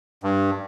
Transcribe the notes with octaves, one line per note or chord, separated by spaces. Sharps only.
G2